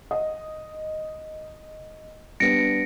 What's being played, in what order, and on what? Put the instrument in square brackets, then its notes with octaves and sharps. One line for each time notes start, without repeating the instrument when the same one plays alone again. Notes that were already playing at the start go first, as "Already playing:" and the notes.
[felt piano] D#5
[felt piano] G3 B3 D4 [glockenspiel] A#6 C#7 D7